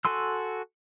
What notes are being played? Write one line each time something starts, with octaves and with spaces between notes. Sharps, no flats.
F#4 A4 G#5 C6 E6